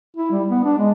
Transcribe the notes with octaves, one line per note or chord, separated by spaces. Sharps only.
E4
G3
B3
D4
G#3